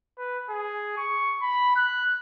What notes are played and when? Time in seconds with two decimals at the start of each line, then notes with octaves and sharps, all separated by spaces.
0.18 B4
0.49 G#4
0.97 C#6
1.42 B5
1.76 F#6